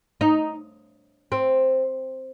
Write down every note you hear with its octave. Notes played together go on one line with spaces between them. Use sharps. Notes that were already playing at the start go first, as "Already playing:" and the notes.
D#4
C4